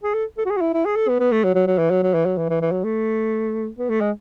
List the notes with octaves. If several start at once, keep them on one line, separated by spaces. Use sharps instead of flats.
G#4
A4
A4
F#4
G#4
F#4
E4
E4
G#4
A4
B3
B3
A3
F#3
F#3
F#3
E3
F#3
F#3
E3
F#3
E3
E3
E3
F#3
A3
B3
A3
G#3